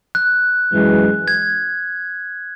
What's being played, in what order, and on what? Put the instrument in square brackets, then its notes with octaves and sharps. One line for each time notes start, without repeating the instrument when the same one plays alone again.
[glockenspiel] F#6
[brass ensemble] F#2 E3 G#3
[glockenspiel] G#6